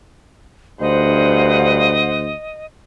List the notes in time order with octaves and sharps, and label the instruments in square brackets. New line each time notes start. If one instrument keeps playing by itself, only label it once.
[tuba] D2 [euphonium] G2 [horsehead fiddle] C5 F#5 [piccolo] D#5